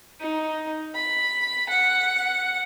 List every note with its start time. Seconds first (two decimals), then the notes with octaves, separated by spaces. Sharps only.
0.21 D#4
0.95 B5
1.69 F#5